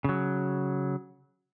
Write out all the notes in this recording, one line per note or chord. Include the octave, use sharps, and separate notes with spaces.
C#3 F#3